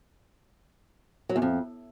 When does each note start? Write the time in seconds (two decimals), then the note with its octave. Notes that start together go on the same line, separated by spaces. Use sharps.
1.29 F#3
1.36 E2
1.42 F2